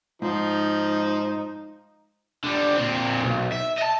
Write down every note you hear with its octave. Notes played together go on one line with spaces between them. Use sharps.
G#2 F3 D#4
D3 G3
A#2 C4
B1
E5
D#5 A5